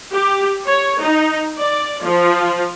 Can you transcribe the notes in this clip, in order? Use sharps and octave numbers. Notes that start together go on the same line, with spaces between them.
G4
C#5
D#4
D5
F3